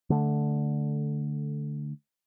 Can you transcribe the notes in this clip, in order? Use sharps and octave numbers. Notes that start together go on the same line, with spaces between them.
D3 A3